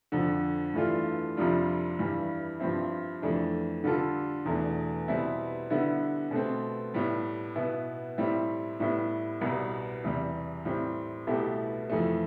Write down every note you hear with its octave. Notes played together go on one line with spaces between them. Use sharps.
F2 D3 F3
G2 E3 A3 D4 F4
F2 C3 G3 D4 F4
G2 E3 G3
G2 F3 C4 E4
F2 E3 A3 D4
D3 G3 D4 F4 A4
E2 B2 A3 D4
B2 G3 C4 E4
D3 G3 B3 E4
B2 A3 C4
A2 G3 B3
B2 B3 E4
A2 G3 C4 E4
A2 G3 B3 E4
C2 B2 G3
E2 C3 G3
A2 G3 C4
C2 B2 A3 E4 G4
F2 E3 A3